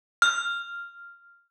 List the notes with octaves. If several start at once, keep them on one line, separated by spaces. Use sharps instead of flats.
F6